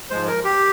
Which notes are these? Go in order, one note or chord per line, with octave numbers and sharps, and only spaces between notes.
G#2 F3 G#3 C5
A#4
G4